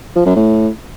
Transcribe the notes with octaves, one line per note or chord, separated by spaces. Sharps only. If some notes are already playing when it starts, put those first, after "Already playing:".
F3
F#2
A2